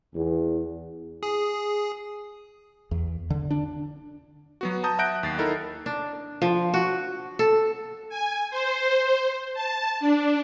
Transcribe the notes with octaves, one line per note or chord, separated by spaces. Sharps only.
E2
G#4
E2
D3
D4
F#3 B3 F#4
A5 A#5 D#6 G6
E5 F#5 F#6 G6 A#6 D7
D#2 A6 C7
D#4 E4 A4 A#4
D4
F3
F#4
A4
G#5
C5
A5
D4